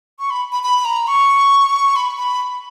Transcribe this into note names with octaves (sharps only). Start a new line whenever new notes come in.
C#6
B5
B5
B5
A#5
C#6
B5
B5